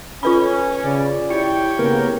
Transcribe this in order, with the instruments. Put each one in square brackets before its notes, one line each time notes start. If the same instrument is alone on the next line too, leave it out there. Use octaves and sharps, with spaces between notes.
[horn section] C#4 [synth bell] F4 B4 B5
[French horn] C#3 [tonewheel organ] D5
[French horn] E4 [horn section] G4 C#5 G5 [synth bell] C#7
[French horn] C#3 [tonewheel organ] A#3 B3 A#4